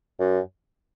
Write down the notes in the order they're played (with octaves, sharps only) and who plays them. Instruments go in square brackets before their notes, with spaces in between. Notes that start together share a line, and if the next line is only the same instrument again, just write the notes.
[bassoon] F#2